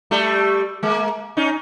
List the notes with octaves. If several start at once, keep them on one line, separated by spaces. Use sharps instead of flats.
G3 A3
G#3 A#3
C#4 D#4